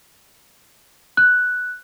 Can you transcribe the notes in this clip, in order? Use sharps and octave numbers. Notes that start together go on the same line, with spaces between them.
F#6